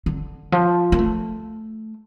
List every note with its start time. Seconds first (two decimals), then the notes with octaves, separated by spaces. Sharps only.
0.06 D3
0.52 F3
0.92 A#3
0.99 A3